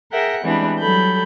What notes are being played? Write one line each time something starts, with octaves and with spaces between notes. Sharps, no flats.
G#4 A#4 E5 F#5 G5
E3 G3 G#3 B3 C4 D4
F#3 G3 A4 B5 G6